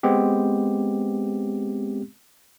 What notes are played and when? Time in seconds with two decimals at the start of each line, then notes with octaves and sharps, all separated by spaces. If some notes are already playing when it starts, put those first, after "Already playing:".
0.03 G#3 B3 C4 G4